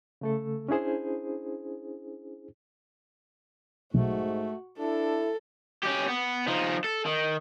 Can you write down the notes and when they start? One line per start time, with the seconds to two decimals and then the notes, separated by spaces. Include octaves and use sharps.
0.21 C#3 A3 A4
0.68 C#4 D4 E4 G#4 C5
3.94 B1 G#2 A3 F#4
4.79 D4 E4 A4
5.83 C#4 G4
6.07 B3
6.48 F3 D#4
6.84 A4
7.06 D#3